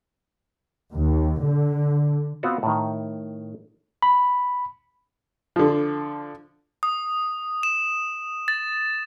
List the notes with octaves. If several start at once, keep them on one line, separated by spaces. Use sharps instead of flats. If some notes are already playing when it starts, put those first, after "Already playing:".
D#2
D3
B3 C4 F4 F#4
A2 D#3
B5
D3 F3
D#6
E7
A6